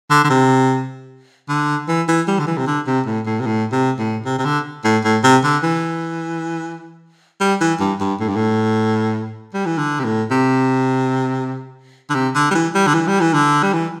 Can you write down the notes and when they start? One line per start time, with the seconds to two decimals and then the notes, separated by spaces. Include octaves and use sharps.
0.10 D3
0.24 D3
0.30 C3
1.49 D3
1.88 E3
2.08 E3
2.28 G3
2.39 D3
2.47 E3
2.58 C3
2.67 D3
2.87 C3
3.06 A2
3.26 A2
3.40 C3
3.46 A2
3.72 C3
3.99 A2
4.25 C3
4.39 C3
4.45 D3
4.84 A2
5.04 A2
5.24 C3
5.44 D3
5.63 E3
7.41 G3
7.61 E3
7.80 G2
8.00 G2
8.20 A2
8.28 G2
8.36 A2
9.54 G3
9.66 E3
9.78 D3
10.00 C3
10.05 A2
10.31 C3
12.10 D3
12.15 C3
12.35 D3
12.51 G3
12.55 E3
12.75 G3
12.87 D3
12.94 E3
13.08 G3
13.21 E3
13.34 D3
13.63 G3
13.73 E3